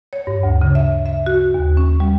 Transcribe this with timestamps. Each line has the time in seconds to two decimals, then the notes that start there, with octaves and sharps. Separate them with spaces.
0.13 C#5
0.27 G2
0.43 D2
0.61 C#3
0.75 E5
1.06 E5
1.26 F#4
1.54 D#2
1.77 C#4
2.00 G3